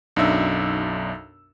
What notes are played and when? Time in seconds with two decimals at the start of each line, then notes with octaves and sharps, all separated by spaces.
0.16 B1 F#2 D4 D#4 E5 E6